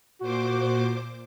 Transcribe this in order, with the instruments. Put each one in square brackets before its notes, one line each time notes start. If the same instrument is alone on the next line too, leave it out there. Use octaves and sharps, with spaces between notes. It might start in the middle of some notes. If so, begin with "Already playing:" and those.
[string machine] A#2 C5 D6 [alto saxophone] F#4